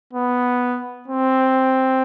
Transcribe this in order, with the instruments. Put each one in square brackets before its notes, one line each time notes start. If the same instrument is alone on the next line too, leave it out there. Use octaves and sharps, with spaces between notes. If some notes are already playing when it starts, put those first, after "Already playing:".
[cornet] B3
C4